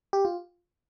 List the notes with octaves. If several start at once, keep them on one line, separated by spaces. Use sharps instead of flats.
G4
F4